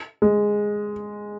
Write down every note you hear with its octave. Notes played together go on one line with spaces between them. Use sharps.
G#3